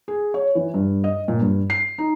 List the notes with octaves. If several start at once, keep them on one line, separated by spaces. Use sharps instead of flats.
G#4
C#5
E3
G2
D#5
A#2
G2
C7
D#4